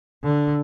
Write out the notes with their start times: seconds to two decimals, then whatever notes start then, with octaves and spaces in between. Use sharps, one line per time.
0.23 D3